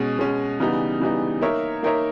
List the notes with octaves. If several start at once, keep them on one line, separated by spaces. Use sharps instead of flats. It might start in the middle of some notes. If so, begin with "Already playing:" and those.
Already playing: B2 G#3 C#4
B2 G#3 C#4
C#3 E3 G3 B3 D#4
C#3 E3 G3 B3 D#4
A#3 D#4 A#4 C#5 E5
A#3 D#4 A#4 C#5 E5